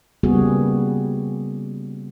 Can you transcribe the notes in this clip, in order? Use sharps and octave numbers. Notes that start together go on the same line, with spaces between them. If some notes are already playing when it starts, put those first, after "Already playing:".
C#3 G3 A#3 B3 F#4 G#4